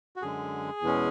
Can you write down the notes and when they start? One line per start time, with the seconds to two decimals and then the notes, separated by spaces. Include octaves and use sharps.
0.16 F#4
0.22 F#2 D3 G#3 G#4
0.82 E2 B2 G#3 C#4